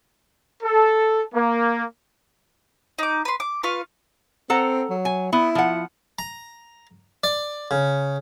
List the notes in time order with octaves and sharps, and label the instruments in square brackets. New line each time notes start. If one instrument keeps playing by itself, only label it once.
[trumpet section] A4
A#3
[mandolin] D#4 D6
B4 C6
D6
F4 B4 F5 C#6
[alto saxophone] C4 [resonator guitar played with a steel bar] A4 F#5 A#5
[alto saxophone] F#3
[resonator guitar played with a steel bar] G#5
[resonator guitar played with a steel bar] B3 [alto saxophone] E4
[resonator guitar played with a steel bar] F3 F#5
[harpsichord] A#5
D5
C#3